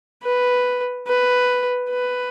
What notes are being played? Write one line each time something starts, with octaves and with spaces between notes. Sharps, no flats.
B4
B4
B4